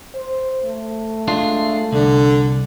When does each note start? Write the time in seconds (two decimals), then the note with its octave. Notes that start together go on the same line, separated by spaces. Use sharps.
0.14 C5
0.66 A3
1.28 G#3 D4 F4
1.93 C2 D3